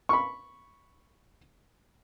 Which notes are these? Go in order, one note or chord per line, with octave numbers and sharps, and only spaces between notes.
B5 C#6